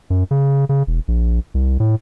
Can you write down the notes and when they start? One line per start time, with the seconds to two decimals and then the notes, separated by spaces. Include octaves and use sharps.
0.10 F#2
0.31 C#3
0.69 C#3
0.87 E1
1.08 A#1
1.54 C2
1.80 A2